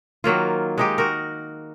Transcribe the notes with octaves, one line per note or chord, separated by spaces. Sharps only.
D#3 F#3 A#3 F4
G#3 D#4 G4
F#4 A#4